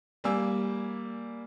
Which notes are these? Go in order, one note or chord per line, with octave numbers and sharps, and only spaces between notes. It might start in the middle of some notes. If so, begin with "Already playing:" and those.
G3 A#3 G#5 E6